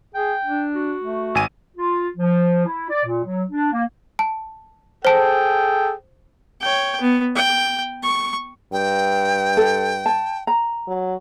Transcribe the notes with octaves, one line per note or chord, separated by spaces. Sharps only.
G#4 G5
D4
F#4
A3
G#1 G#5 D#7
F4
F3
E4
D5
A#2
F#3
D4
A#3
A5
G#4 A4 C5 G5 A5
C#5 G5
B3
G5
C#6
G2 G5
A4
A5
A#5
F#3